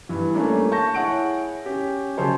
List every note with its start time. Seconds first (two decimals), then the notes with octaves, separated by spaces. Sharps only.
0.09 G2 E3
0.34 G3 A3 A#3 C#4 D4
0.71 A5 C#6 G6 A#6
0.95 E4 G#4 C#5 F#5 C#6 D7
1.65 C#4 G4
2.17 C#3 F#3 G#4 C5 C#5 A5